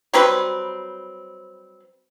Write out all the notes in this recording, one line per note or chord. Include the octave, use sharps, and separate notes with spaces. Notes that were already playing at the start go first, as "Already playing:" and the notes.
F#3 G3 C4 B4